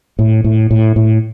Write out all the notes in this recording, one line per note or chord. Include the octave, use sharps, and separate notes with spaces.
A2
A2
A2
A2